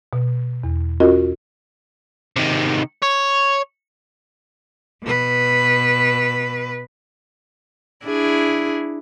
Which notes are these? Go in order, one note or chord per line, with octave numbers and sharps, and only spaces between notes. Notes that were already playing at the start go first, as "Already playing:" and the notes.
B2
E2
C#4 F4 F#4 A#4 D#5
C3 D#3
C#5
B2 B4
D4 E4 G#4